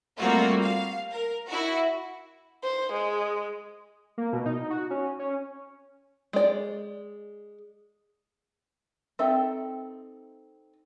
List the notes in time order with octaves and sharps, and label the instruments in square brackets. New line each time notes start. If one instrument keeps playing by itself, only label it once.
[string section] G3 A3 A#3 C4 F4 F#4
F5
A#4
E4 F#4
[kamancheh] C5
G#3
[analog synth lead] A#3
B2
D#4
F#4
C#4
C#4
[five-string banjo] G#3 D5
C4 D#4 A4 E5 G5